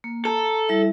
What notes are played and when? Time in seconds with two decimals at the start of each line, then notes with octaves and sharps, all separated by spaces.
0.04 A#3
0.25 A4 A#5
0.69 G3 E4 E5